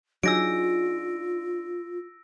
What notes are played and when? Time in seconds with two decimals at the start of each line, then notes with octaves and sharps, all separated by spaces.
0.23 F#3 D4 D#4 F4 G#4 E6 A#6 D7